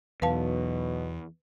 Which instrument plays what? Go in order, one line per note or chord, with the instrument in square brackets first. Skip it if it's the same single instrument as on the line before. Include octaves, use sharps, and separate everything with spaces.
[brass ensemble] B1 B2 [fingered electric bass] E2 [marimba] B4 F5 A5